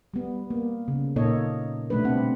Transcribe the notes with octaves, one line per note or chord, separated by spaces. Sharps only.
G3 B3
A#3
C#3
A#2 A#3 D#4 A4 C#5 D#5
B2 G3 A3 D4 B4
C4 D4 F#5